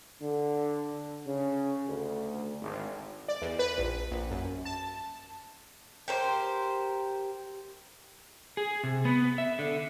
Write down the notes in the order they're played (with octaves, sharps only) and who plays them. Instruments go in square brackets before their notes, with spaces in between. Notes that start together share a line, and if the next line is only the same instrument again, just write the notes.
[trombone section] D3
C#3
D2
G#1
[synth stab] D5
E2
B4
A#1
A#1
F#2
A5
[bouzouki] G4 A#4 C5
[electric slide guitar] G#4
C3
B3
E5
D3